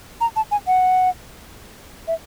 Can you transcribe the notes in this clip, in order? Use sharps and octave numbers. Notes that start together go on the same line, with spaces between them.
A#5
A5
G#5
F#5
E5